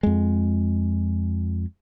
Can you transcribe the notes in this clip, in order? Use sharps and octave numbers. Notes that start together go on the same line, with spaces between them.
F2 G#3